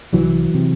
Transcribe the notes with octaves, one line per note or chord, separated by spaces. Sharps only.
C2 E3 F#3
C3